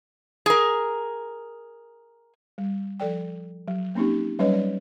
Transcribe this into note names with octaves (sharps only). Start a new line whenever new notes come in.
G#4 A#4
G3
F3 A4 D5 G5
F#3
A#3 C4 C#4 D#4 G4
F#3 G3 C#4 B4 C#5 D#5
D5